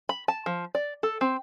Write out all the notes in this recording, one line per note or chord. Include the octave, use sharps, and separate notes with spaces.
B5
A5
F3
D5
A4
C4